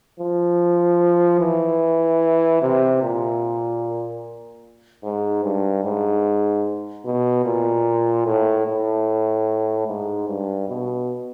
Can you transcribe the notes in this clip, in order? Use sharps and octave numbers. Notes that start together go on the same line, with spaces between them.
F3
E3
C3
A#2
G#2
G2
G#2
B2
A#2
A2
A2
G#2
G2
B2